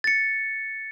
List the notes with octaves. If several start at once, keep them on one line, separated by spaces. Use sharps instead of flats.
A6 C#7